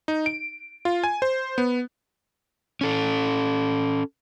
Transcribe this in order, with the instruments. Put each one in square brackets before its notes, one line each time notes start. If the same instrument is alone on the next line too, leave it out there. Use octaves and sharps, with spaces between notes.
[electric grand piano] D#4
D7
F4
G#5
C5
B3
[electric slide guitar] C#4 A4